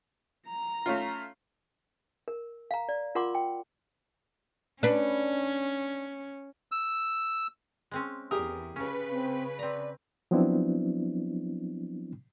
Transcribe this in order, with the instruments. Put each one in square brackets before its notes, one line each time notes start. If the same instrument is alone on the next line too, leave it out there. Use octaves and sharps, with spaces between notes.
[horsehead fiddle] A#5
[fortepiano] A3 C#4 F4
[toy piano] A#4
F5 A#5
D5
F4 A#4 F#5 C6 D6
G5
[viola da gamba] C#4 [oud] D4 B4
[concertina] E6
[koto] G#3 C4 C#4
[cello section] E2 [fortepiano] G4 G#4 D#6 [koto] A#4
[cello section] C#3 B4 [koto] C#4
[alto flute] C4
[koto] C4 A#5 [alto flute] D5
[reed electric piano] F3 F#3 B3 C4 D4 E4